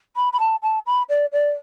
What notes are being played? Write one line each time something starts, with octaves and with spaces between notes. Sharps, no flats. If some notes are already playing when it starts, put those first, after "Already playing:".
B5
B5
A5
A5
B5
D5
D5